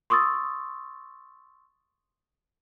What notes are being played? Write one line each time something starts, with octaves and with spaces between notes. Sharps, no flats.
C6 C#6 D#6 E6 A6